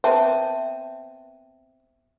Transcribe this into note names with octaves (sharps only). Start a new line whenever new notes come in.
B3 C4 E5 A5